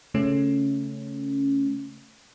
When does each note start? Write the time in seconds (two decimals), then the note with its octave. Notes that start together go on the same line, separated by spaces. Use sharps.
0.14 C#3 A3 C#4